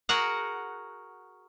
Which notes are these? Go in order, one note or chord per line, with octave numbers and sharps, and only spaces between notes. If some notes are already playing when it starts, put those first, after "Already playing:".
F#4 G#4 A#4 F#5